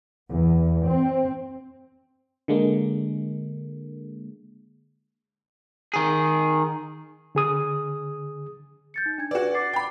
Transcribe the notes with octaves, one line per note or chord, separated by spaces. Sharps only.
E2
C4
D3 G#3 A#3
D#3 G#4
D3 G#4 D#6
G6 A6 C#7
D#4
D4 G#6
F#4 B4 D5
D6 A6 C7
G5 B5